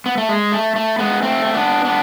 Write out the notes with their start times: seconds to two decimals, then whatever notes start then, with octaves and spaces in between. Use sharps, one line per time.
0.06 B3
0.18 A3
0.29 G#3
0.52 A3
0.76 A3
0.99 G#3 B3
1.23 A3 C4
1.45 C4
1.54 B3 D4
1.85 B3 D4